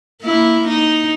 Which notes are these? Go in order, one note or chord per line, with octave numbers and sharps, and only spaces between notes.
A#3 E4
D#4